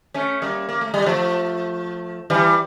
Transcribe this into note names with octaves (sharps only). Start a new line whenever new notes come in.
A3 C#4
G3 A#3
A#3
A3
G3
F3 A3
E3 G3